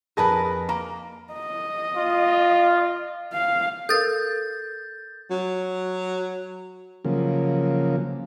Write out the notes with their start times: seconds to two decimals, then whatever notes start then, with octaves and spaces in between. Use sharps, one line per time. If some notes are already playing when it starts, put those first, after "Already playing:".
0.17 F2 G#4 A#4 B4 A5 A#6
0.69 A#3 A#5
1.33 D#5
1.96 F4
3.33 F5
3.89 A4 A#4 G6 A6
5.31 F#3
7.05 C#3 F3 F#3 A#3